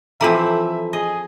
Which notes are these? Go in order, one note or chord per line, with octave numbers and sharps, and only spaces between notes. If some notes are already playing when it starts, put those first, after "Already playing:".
E3 F3 C4 F4 A4 E5 A#5
G#4 D#5